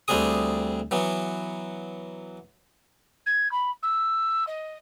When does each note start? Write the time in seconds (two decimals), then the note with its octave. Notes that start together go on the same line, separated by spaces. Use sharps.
0.08 D2 G3 C4 D4 G#4 D#6
0.91 E3 F#3 B3
3.26 G#6
3.52 B5
3.83 E6
4.47 D#5